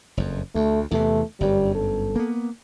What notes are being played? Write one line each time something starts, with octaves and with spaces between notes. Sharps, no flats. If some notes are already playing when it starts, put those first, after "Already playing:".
F#1 F2
D2 A3
E2 C3 E3 A3
G1 F#2 G3
A4
A#3 B3